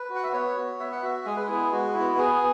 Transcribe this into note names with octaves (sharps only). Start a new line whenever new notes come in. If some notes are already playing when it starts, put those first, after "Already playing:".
Already playing: B4
F#4
F#5
E5
B3 C#5
F#4
B3 E5
F#5
F#4 E5
G#3 G#4
B4
B3 E4 G#4
G#3 F#4
E4
B3
B3 G#4